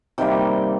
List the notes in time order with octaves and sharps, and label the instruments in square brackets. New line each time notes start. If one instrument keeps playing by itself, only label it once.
[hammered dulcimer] C3 D#3 G3 A#3 G5